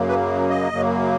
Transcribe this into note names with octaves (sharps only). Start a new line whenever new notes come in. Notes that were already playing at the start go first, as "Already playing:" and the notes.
Already playing: F#2 C#3 F#3 A#3
B4
D#5
F#2 C#3 F#3 A#3